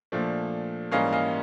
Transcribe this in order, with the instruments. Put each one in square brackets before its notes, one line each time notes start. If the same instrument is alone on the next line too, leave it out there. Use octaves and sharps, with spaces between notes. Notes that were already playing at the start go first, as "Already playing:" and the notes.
[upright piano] A#2 F3 A3 D4
G#2 E3 G3 A#3 C#4 D#5 F5
D#5 F5